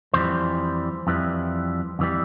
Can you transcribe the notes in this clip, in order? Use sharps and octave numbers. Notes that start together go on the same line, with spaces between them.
F2 E3 G3 C5
F2 E3 G3
F2 E3 G3